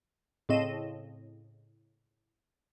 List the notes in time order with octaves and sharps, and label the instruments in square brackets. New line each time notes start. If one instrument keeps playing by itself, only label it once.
[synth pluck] A2 C#3 C4 D#5 E7